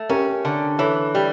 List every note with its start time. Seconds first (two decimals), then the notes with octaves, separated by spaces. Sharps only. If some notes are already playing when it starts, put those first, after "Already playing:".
Already playing: A3
0.09 C#4 G4 A#4
0.45 D3
0.79 E3 A4 C#5
1.15 G3